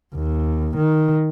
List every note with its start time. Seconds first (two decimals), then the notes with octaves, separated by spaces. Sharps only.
0.15 D#2
0.76 D#3